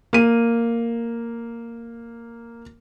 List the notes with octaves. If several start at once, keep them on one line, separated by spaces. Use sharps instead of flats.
A#3 D#7